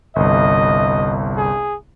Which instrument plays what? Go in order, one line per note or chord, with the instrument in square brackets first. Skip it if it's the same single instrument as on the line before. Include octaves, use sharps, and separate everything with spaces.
[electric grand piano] G1 C2 [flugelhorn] D#5
[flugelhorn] G#4